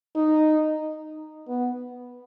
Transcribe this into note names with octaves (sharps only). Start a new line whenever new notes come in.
D#4
B3